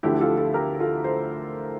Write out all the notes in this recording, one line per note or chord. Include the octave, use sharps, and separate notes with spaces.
D2 D3 F3 E4 G4
G4
F4 A4
F4 A4
G4 A#4
F4 A4
A4 C5